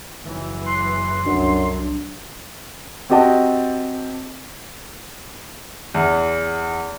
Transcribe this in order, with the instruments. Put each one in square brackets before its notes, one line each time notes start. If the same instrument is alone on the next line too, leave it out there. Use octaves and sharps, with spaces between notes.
[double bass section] F#1 E3 F#3
[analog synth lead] C6 [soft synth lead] F#6
[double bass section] C2 A2 F#3 [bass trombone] F#2 [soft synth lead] D4
[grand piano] C4 F#4 G4 D#5 A5
[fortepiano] E2